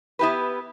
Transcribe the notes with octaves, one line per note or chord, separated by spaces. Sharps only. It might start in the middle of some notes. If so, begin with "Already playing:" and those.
B3 E4 G4 B4